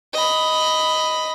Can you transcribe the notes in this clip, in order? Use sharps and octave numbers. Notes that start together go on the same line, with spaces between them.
D#5 B5